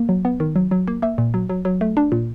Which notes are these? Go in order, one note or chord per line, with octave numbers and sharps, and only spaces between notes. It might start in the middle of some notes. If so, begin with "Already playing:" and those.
Already playing: A#3
F#3
B3
D#3
F#3
F#3
A#3
A#3 E5
A#2
F#3
F#3
F#3
A3
D4
A#2